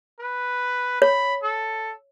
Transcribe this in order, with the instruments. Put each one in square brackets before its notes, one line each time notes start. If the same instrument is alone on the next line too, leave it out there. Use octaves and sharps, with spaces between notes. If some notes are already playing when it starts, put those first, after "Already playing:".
[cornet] B4
[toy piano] C#5 [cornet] B5
[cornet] A4